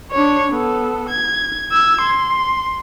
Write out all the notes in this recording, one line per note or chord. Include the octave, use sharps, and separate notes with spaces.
D4 C#5
B3 A4
G#6
E6 G#6
C6